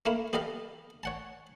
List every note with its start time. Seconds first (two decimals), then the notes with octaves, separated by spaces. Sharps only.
0.06 A3 A#3 E4 F5
0.33 B3 G4 A4 D#5 F5
1.03 C#5 F#5 A5